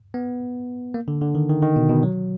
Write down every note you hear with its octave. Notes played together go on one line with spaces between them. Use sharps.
B3
A#3
D3
D3
D#3
D#3
D#3
B2
B2
F#3